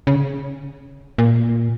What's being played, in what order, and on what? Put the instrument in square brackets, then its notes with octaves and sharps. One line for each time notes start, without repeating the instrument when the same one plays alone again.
[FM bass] C#3
A#2